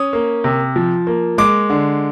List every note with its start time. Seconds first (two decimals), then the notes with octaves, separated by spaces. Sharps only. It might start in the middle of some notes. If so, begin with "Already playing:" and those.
Already playing: C#4 D#6
0.13 A#3
0.44 C3
0.76 F3
1.07 A#3
1.38 G#3 D6
1.70 D3